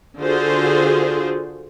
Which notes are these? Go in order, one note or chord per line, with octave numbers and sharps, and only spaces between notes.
D3 F4 F#4 G#4 C5